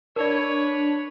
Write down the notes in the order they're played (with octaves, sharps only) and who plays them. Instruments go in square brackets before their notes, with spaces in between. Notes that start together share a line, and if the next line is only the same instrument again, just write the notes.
[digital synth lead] D4 [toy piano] A#4 D5 [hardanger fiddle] B4 C#5